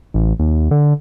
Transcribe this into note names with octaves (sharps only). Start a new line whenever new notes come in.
A1
D#2
D3